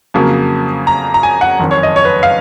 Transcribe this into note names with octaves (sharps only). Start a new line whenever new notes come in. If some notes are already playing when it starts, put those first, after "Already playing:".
F2 C#3 F#3 A#3
A#5
A#5
G#5
F#5
F#1 F2 D#3
C#5
D#5
C#5
B4
F5